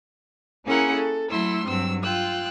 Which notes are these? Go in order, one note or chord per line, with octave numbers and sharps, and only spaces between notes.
A#3 C#4 E4 G#4 A#4 F#5
A4
F#3 A3 E4 C6 E6
G2 F#3 C4 E6
F4 G5 E6 F#6